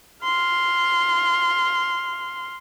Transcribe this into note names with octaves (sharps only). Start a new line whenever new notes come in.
C6 F6